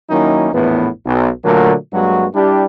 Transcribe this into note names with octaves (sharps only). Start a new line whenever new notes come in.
D#3 F#3 A#3 C#4 D#4 E4
A#1 E2 A2 B3
B1 B2
A#2 D3 F#3 A3 A#3
G2 F#3 G#3 A#3 F#4
G3 D4 E4 G4